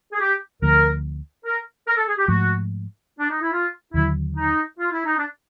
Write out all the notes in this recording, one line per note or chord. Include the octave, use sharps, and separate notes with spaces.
G#4
G4
D2 D3 F3 A3 A#4
A#4
A#4
A4
G#4
G4
G#2 F3 A3 F#4
D4
D#4
E4
F4
D#2 D3 F#3 E4
D#4
F4
E4
D#4
D4